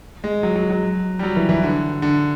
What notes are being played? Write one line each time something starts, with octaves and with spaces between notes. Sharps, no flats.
G#3
F#3
F#3
F#3
G3
F#3
E3
E3
D3
D3